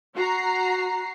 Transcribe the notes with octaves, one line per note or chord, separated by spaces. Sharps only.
F#4 A#5 C7